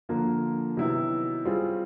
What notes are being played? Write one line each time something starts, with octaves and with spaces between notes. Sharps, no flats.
D3 F3 A#3
C3 D#3 F#3 B3 E4
G3 C4 F4 G#4